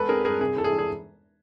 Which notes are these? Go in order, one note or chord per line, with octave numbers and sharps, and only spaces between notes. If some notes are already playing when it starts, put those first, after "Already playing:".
Already playing: E2 G#3 A4 B4
C4 G#4 A#4
G2 G#4 A#4
C3 G#4
E3 A4
G#4
E1
G#4